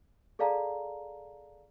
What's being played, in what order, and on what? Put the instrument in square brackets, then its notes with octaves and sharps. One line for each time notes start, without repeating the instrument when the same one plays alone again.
[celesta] G#4 A4 D5 F5 A5 A#5